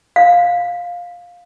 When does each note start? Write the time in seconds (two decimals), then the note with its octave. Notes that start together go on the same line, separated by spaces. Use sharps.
0.16 F5